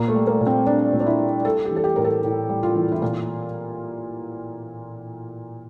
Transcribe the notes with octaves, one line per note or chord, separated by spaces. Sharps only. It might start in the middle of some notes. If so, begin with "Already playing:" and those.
Already playing: A#2 A#3
A3
G3
A#3
A#2
C4
G3 D4
A#2
D4
E4
G3
G3 A4
G4
E3
A4
G4
A2 A#4
A4
A2
G3
F4
E3
E4
A#2 F4